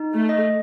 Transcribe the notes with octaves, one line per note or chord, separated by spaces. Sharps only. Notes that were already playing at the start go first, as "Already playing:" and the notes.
Already playing: D#4
A3
D#5